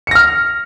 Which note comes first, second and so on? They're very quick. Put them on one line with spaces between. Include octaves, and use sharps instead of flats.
C#7 A#6 F6